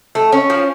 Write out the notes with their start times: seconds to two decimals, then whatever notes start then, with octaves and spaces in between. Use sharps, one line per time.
0.15 A3
0.32 C#4
0.50 F3